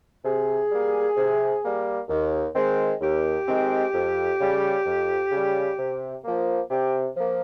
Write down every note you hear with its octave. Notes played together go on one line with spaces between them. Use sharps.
C3 G#4
G3 A#3
C3
G3 A#3
D#2
D#3 G#3 C4
D#2 G4
D#3 G#3 C4
F2
C#3 G3
F2
C#3 G3
C3
F3 A#3
C3 G4
F3 A#3